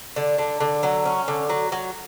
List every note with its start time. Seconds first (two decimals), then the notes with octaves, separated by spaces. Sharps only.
0.16 D3
0.38 D3
0.60 D3
0.83 F#3
1.05 C#4
1.28 D3
1.49 F#3
1.72 F#3